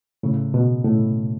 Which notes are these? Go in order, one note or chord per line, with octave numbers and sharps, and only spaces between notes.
A2 C#3
B2
A2